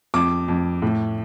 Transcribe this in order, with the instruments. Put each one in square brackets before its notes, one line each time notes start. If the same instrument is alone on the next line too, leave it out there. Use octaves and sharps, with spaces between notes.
[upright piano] F2 D6
F2
A2